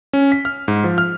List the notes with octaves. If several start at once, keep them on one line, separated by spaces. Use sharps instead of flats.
C#4
B6
F6
G#2
F3
F6